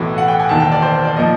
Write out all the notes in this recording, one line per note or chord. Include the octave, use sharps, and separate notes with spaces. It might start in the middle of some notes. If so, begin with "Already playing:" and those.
Already playing: B1 A2 E3
F#5
G5
G#5
E1 D#2 D#3 A5
G5
D5
C5
D5
A#2 F3 D#5